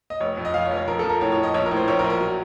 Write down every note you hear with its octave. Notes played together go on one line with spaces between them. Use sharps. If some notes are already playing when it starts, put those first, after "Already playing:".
D#5
F1 C#5
F2
D#5
F2 F5
C#5
F1
C#5
F3 A#4
F3 A4
A#4
A2 C#5
C#5
F3
D#5
A#1 C#5
A#4
A2
C5
A#1 C#5
A#4
A#1
A#4
F#3